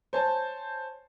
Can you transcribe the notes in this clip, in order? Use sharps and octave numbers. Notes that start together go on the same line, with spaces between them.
C5 C#5 G#5 A5